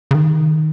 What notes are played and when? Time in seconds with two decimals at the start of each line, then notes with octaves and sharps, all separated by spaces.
0.11 C#3
0.15 D#3